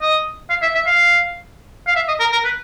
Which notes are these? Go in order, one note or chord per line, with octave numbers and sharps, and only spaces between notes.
D#5
F5
E5
E5
F5
F5
E5
D#5
A#4
A#4
B4